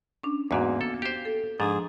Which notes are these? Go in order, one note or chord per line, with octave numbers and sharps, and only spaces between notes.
C#4 D4
E2 G#2 A#3 B3 F#4 D6
A4
G4 C5
A4
G#2 F3 D4 G#4